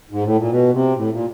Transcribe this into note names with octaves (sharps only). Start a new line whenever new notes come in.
G#2
A2
A#2
B2
C3
A2
A#2